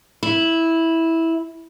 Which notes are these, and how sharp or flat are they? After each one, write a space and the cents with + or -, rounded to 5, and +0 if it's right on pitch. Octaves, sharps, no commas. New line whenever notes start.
E4 -10